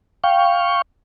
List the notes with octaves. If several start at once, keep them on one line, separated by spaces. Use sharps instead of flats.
F5 G5 C#6